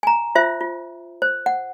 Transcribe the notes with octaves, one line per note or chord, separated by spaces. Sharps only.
G#5 A#5
F4 C5 E5
F4
C5
F#5